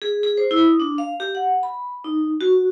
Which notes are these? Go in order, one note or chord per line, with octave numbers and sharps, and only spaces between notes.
G#4
G#4
C5
E4
D#6
D4
F5
G4
F#5
B5
D#4
F#4